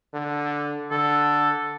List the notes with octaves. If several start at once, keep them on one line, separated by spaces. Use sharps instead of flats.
D3
D3 A4